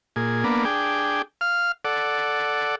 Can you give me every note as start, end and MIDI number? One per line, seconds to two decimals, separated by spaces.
0.16 0.44 46
0.16 0.44 68
0.44 0.65 58
0.44 0.65 59
0.44 0.65 62
0.65 1.22 62
0.65 1.22 68
0.65 1.22 79
1.41 1.72 77
1.41 1.72 89
1.85 2.75 69
1.85 2.75 74
1.85 2.75 78